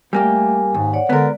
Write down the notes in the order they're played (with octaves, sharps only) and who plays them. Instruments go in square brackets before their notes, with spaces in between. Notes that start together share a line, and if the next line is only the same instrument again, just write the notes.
[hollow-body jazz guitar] G3 A#3 G4 [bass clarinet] A3 [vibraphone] G#5
[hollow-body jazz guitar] D#2 [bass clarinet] G#2
[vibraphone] C#5 D5 F#5
[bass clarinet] D3 [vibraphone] G#3 D5 [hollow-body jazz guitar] B3 A#4